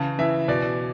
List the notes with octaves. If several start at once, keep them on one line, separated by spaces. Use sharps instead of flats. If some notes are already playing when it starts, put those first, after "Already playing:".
Already playing: C#3 E3 A5
E3 E5
B2 D5